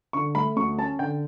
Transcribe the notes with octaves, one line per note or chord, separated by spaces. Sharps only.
D3 C#6
A3 B5
D2 C#6
C#4 A5
D3 G5